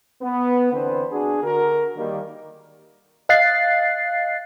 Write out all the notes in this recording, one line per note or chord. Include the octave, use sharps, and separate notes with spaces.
B3
D3 E3 C4 D4 B4 C5
D4 F#4 G#4
D3 F#4 A#4
D#3 G3 A#3
D#5 F5 F#6 A6 C7